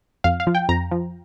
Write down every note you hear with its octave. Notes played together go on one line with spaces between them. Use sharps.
F2 F5
F5
F3
G5
F2 A#5
F3